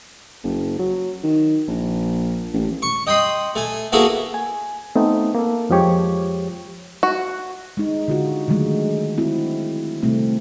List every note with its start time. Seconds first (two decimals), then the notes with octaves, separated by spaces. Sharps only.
0.44 F#1
0.79 F#3
1.23 D#3
1.68 A#1
2.53 A1
2.82 C#6
3.07 D#5 G5 B5 C6 D#6
3.56 A3 G#5
3.92 A#3 B3 E4 F#4 G#4 A4
4.34 G#5
4.95 A3 B3 C4 D#4
5.35 A#3 A4
5.70 F2 F3 G#3 G4 C#5
7.03 F#4
7.77 G#3 D#4
8.08 D3 F4 F#4
8.48 D3 D#3 F#3 G#3 A3
9.18 C4 E4 F#4
10.03 C3 G3 A3 C4